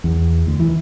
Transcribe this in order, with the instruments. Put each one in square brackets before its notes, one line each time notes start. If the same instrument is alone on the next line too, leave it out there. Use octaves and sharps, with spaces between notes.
[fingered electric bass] E2
D2
E3